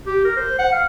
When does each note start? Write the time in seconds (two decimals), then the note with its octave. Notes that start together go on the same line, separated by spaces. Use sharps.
0.07 G4
0.25 A#4
0.37 C5
0.59 F#5
0.72 F5